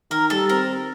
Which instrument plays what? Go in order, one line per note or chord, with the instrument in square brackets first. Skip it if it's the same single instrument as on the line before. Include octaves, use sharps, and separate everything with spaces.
[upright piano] D#3 [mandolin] A#4
[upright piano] G3 [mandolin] A4
[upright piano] C4 [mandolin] A#4